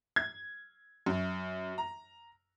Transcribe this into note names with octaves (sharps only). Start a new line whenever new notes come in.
G#6
F#2
A#5